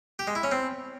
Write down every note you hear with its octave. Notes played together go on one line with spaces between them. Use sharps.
G4
G#3
E4
C#4
C4